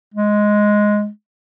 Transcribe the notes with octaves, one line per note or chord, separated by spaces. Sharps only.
G#3